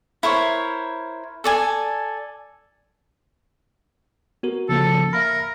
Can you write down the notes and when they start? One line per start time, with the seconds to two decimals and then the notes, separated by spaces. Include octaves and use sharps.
0.23 E4 A#4 C5 C#5
1.44 A4 D5 G#5
4.43 B3 F#4 A#4
4.69 C#3 F3 A#3 A4
5.13 A#4 E5 F5 B5